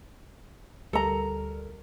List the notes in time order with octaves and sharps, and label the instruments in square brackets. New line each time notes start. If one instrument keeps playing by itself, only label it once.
[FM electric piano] D2 G3 A#4 [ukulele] A4 A#5